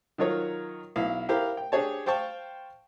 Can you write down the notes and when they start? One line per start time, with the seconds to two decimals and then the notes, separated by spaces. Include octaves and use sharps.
0.18 D#3 F#3 F4 A#4 C#5 A#5
0.96 B1 E4 F5
1.29 E4 G4 A#4 C5 F5
1.57 G5
1.72 D4 G4 G#4 C#5 A5
2.06 C5 F5 G5 A5 C#6